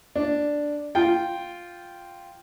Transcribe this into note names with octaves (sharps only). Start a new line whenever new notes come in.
D4
F4 G5